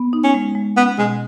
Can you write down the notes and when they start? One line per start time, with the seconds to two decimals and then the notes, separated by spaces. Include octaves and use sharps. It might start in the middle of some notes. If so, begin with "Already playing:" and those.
Already playing: B3
0.13 D#4
0.24 C#4
0.34 G#3
0.55 G#3
0.77 B3 C#4
0.98 B2 G#3